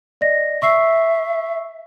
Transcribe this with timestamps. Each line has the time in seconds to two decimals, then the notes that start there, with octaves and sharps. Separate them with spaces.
0.21 D5 D#5 A#6
0.62 E5 C#6 E6 C7